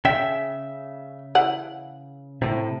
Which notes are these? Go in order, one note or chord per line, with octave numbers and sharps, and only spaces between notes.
C#3 E5 G5
E3 F#5
A2 C3